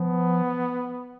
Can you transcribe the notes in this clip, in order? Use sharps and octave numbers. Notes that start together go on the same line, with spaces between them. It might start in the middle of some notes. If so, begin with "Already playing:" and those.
Already playing: F3 B3